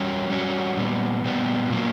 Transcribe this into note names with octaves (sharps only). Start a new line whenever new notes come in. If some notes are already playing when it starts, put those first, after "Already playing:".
Already playing: G3 C#4 F#4 C#5
G3 C#4 F#4 C#5
A#2 G3 B3
A#2 G3 B3
A#2 F#3 A#3